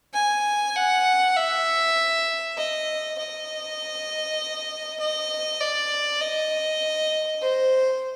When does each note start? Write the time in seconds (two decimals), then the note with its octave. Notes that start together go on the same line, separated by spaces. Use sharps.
0.14 G#5
0.76 F#5
1.36 E5
2.57 D#5
3.19 D#5
5.00 D#5
5.60 D5
6.21 D#5
7.42 C5